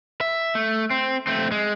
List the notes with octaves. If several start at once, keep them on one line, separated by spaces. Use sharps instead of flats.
E5
A3
C4
A3 C4
G#3